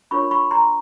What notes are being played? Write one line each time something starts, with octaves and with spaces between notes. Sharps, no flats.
D4 F4 A#4 C#5 B5 C#6
B5 C#6
A#5 C6